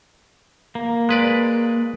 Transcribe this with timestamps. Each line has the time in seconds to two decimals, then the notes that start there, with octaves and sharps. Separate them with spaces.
0.75 A#3
1.09 G#3 B4 D5